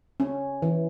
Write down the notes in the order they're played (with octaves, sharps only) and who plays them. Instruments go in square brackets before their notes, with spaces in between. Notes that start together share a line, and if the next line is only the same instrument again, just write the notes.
[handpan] C#4
E3